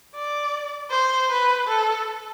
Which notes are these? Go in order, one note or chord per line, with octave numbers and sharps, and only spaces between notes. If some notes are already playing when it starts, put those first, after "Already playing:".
D5
C5
B4
A4